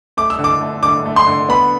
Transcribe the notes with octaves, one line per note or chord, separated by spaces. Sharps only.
A3 D6
E6
D3
D6
A3
D3 D6
A3
C6
D3
B3 B5